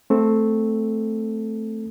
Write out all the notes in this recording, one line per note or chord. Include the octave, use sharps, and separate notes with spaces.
A3 C4 A4